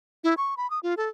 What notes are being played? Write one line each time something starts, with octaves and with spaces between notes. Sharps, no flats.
E4
C#6
B5
D#6
F4
A4